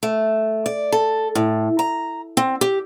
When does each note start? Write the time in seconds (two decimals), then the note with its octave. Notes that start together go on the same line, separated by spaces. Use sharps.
0.03 A3
0.66 D5
0.92 A4
1.35 A2
1.79 A#5
2.37 C4
2.61 G4